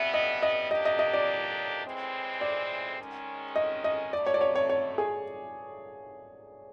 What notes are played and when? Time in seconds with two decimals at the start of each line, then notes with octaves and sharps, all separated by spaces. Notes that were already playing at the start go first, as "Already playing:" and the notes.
Already playing: B2 G3 B3 E5
0.14 D#5
0.43 D#5
0.71 F#3 A#3 D4 G4 D#5
0.85 D#5
0.99 D#5
1.14 D5
1.85 A2 E3 G#3 C4
2.41 D5
2.99 D#3 G#3 C#4
3.56 D#5
3.84 D#5
4.13 B2 F#3 A3 D5
4.26 C#5
4.34 D5
4.41 C#5
4.55 C#5
4.70 C#5
4.98 G#4